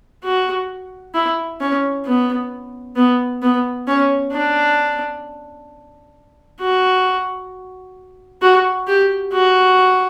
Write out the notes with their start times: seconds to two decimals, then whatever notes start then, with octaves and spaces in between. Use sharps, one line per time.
0.24 F#4
1.14 E4
1.60 C#4
2.05 B3
2.96 B3
3.42 B3
3.88 C#4
4.32 D4
6.60 F#4
8.42 F#4
8.88 G4
9.33 F#4